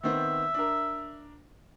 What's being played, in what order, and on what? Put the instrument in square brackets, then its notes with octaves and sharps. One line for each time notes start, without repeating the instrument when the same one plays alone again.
[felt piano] D#3 B3 C4 [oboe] E5
[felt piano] D4 A#4